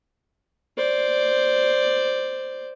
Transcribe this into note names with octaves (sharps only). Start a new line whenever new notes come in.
C5 D5